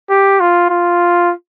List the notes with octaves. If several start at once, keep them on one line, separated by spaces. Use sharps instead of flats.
G4
F4
F4